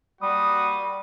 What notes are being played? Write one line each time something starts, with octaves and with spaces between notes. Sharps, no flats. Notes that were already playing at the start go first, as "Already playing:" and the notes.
G3 A#3 F#4 D#6